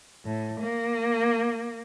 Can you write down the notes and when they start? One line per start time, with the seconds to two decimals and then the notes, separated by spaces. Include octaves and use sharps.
0.25 A2
0.60 A#3